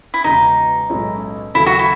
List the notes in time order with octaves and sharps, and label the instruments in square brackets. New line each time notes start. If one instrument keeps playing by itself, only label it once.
[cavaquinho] E4
[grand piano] E1 E2 C#3 [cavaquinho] D#4
[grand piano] B1 A2 G#3 C#4 E4
[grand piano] D#2 C#3 F#3 A3 [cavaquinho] E4
[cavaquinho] F#4
E4